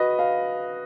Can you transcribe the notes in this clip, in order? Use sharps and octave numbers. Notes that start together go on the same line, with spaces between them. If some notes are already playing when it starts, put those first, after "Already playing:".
Already playing: F#4 B4 D#5
F5